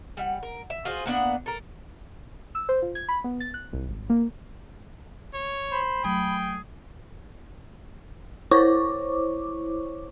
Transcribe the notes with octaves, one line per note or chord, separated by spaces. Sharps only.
G3 E5 F#5
A#4
E5
F4 F#4 G#4 C5
A#3 B3 D4 F#5
A4 A#4
E6
C5
F4
G#6
B5
B3
A6
F#6
C2
G#1
A#3
C#5
C5 B5
F#3 A3 G#4 G5
E4 C5 C#5 C#6 D6